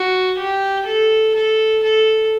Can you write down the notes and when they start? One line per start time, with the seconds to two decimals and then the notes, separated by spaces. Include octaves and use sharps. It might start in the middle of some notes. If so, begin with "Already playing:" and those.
Already playing: F#4
0.38 G4
0.86 A4
1.35 A4
1.83 A4